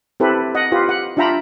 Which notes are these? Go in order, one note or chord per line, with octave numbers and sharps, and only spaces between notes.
C4 E4 G4 A4 B4
D#5 F#5
F4 G4 B4
F#5
D4 F4 E5 G5 A#5 B5